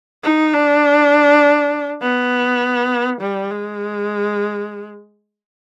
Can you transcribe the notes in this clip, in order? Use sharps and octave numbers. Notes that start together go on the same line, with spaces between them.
D#4
D4
B3
G3
G#3